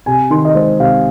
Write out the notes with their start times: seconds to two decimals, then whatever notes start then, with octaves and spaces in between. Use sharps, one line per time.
0.06 C3 G#5
0.30 D#3 C6
0.45 D#5
0.55 G#3 C5
0.80 C3 F5